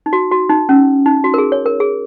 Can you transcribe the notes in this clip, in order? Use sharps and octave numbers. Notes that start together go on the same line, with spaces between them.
D#4
F#4
F#4
D#4
C#4
D#4
F#4
A#4
G#4
C#5
A#4
G#4